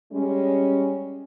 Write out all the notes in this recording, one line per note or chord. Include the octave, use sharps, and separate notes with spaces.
G3 G#3 C#4